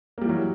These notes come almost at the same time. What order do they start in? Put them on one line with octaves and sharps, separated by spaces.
A#3 G3 E3 F#3